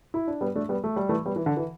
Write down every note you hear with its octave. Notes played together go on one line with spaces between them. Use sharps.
E4
D4
G3 B3
A3 D4
G3 B3
A3
G3
E3 A3
G3 B3
E3
D3
E3